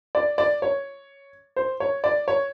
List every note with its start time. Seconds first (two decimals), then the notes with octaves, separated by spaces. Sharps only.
0.15 D5
0.38 D5
0.62 C#5
1.56 C5
1.80 C#5
2.04 D5
2.28 C#5